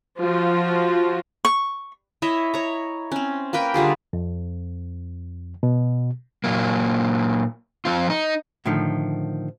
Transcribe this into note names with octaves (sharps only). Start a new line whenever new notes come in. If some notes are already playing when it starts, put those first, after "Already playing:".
F3 F4 F#4
C#6
E4 C#5 D#5 E5
C#5 A#5
C4 C#4
A#3 A#4 B4 G5
D3 G3 F4 G#4
F2
B2
A#2 F#3 A#3
F3 C4 F4
D#4
A2 D3 D#3 F3